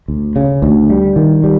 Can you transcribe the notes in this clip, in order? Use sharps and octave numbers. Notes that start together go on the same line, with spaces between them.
D2
C#3
D2
G3
D#3
G3